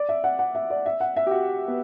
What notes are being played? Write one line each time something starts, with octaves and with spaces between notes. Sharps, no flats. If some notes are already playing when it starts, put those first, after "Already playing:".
Already playing: D5
E5
F#5
F#5
E5
D5
E5
F#5
E5
G4
F#4
B3